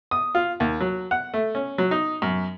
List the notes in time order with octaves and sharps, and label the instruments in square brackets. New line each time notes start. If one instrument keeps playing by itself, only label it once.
[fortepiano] D#6
F4
D#2
F#3
F#5
A3
C#4
F#3
D#4
F#2